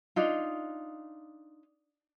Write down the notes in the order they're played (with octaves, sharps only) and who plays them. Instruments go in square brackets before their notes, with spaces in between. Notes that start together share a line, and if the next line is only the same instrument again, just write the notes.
[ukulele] D4 D#4 F4